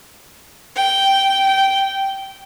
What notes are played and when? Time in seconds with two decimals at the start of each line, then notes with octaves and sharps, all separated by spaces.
0.76 G5
1.47 G5